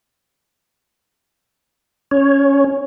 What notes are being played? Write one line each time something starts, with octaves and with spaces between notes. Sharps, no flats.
C#4 C#5